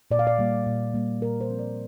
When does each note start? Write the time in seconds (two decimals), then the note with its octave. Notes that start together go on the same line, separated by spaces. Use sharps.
0.11 A#2 D5
0.19 F5
0.27 D5
0.39 G3 A#3
0.66 A#2
0.94 G3 A#3
1.22 A#2 A#4
1.41 C5
1.50 F3 C4
1.59 D5